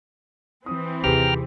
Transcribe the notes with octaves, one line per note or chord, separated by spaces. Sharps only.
E3 C4 D#6
D#2 C3 G4 G#4 B4 G5 A#5 F6